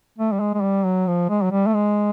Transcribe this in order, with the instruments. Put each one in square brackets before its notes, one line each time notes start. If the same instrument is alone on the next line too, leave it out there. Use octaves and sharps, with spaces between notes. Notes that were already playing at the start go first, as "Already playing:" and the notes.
[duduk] A3
G3
G#3
G#3
G3
F#3
F3
G#3
F#3
G3
A3
G#3